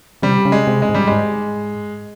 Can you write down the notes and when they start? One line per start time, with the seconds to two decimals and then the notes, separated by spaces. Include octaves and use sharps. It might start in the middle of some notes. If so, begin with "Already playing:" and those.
0.22 C3 G3
0.45 C#3
0.52 G#3
0.67 C3
0.82 G#3
0.89 G#2
0.95 G3
1.07 G#2 G#3